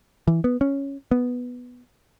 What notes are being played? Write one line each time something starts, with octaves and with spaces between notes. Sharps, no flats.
E3
B3
C#4
B3